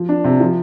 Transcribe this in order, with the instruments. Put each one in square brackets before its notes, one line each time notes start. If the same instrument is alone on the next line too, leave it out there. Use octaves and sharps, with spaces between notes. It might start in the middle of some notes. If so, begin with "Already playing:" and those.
Already playing: [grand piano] F3
D4
C3
F3